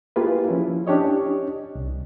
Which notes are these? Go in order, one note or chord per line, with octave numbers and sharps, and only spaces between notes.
A#3 E4 F4 G4 G#4 B4
F3 C#4 E4
C#4 D4 G4 C#5 D#5
C2